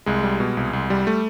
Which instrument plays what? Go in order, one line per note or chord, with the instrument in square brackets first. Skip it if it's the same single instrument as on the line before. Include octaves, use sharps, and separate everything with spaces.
[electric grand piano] C2 G#3
G3
B2
C2
C2
G3
A3